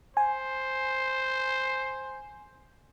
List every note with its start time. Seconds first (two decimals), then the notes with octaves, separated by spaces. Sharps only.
0.17 C5 G#5